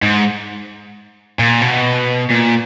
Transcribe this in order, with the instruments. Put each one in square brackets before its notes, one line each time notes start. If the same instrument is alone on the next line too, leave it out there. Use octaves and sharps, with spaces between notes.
[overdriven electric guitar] G#2
A#2
B2
A#2